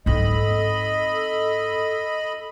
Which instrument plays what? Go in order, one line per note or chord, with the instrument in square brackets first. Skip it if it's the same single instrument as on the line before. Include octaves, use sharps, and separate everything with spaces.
[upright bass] G#2 C4 [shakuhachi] A4 [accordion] D#5 B5